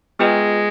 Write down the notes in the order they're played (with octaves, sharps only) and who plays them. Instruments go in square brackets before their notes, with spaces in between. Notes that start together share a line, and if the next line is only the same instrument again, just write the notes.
[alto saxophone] G#3 [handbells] B3 F4 B4 D#5 G5